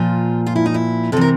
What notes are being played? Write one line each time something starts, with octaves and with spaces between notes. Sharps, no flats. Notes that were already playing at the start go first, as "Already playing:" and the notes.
Already playing: A#2 F3 F4
F4
E4
D#4
E4
C3 E3 A4 A#4